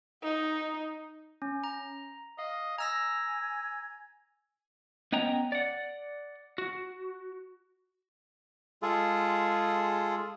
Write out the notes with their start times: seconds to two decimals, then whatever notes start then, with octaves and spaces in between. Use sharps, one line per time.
0.23 D#4
1.42 C#4
1.64 A#5
2.39 D#5 F5
2.78 G#5 A#5 E6 A#6
5.12 B3 C#4 D#5 G5 A#5
5.52 D5 F#5
6.58 F#4
8.82 G#3 F4 G#4 A4